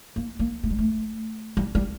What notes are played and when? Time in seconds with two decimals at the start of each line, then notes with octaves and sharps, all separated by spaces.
0.16 A#3
0.39 A#3
0.63 A3
0.70 G3
0.78 A3
1.57 G3
1.75 G3